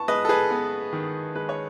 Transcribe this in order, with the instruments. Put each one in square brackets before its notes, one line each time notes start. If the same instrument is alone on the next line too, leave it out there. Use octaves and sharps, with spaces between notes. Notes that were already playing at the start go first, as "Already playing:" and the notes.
Already playing: [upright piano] B3 A5 C#6
G#3 B4 D#5
A4
G#4 B4
B3
D#3
G#3 B4
C#5